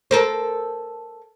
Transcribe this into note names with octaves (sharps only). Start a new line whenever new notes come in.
A4 A#4 C5